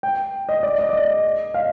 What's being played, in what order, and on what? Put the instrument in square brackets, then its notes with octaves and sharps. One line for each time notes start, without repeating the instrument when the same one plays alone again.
[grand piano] G5
D#5
D5
D#5
D5
D#5
F5